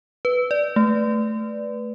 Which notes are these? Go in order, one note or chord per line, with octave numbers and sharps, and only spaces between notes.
B4
D5
A3